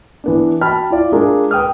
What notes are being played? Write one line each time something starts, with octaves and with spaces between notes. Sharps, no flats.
E3 B3 D4
F#4 G5 A5 B5 F6
E4 F4 D5
G#3 D4 F4 G#4 A#4
B4 G5 D#6 F6